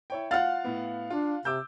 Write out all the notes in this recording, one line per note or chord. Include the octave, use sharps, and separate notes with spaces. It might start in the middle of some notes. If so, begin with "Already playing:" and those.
E4 C#5 G5
F4 F5 F#5 F6 A6
A2 B3
D4 F4
C3 D6 E6 G6